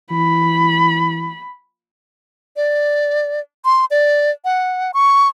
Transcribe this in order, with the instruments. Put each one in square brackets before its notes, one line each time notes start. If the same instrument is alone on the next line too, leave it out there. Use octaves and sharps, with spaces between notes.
[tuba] E3 [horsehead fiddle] B5
[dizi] D5
C6
D5
F#5
C#6